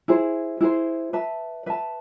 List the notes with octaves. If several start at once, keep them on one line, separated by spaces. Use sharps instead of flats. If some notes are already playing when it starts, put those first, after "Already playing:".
E4 G#4 C5
E4 G#4 C5
B4 E5 A5
B4 E5 A5